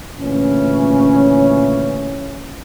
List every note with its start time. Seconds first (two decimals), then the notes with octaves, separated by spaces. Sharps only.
0.18 D2 A#2 C#3 E3 C#4